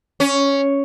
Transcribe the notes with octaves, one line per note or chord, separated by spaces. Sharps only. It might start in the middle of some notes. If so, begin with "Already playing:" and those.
C#4